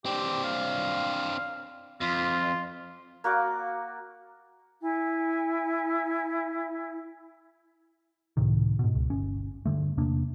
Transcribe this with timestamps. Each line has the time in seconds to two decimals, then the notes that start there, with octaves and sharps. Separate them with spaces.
0.06 C4 D4 G4
0.44 F5
2.01 F2 F4
3.24 A#3 F#4 D5 D6
4.81 E4 G#5
8.37 C#2 A2 C3 D#3
8.79 G#2 B2
8.95 C#2
9.10 G1 C#4
9.66 G2 D3 A3
9.97 E2 C3 A#3 D4